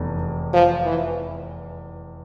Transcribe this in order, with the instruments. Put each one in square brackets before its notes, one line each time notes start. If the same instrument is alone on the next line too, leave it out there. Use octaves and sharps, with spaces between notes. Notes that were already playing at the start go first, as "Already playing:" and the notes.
Already playing: [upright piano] F1 E2
[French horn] F3
E3